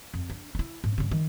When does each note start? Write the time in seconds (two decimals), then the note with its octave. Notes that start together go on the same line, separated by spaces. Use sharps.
0.14 F2
0.30 D4
0.55 D#4 E4
0.84 G#2
0.98 G2 C#3
1.11 D#3